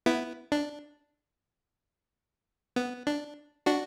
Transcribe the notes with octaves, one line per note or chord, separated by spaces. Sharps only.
B3 E4
D4
B3
D4
D4 F#4